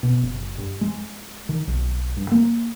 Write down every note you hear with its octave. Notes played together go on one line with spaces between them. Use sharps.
B2
F#1
G2
G#3
D#3
B1
G2
A#3